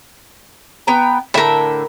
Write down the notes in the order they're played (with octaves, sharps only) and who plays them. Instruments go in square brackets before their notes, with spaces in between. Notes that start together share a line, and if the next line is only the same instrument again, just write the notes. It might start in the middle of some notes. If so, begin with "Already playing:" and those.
[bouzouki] B3 G5 A#5
[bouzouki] A2 D3 E5 [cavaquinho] A#4 B5